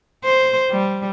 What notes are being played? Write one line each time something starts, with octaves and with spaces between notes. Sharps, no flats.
C5
G3